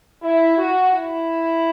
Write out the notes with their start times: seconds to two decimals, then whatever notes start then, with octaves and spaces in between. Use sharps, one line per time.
0.22 E4
0.58 F#4
0.93 E4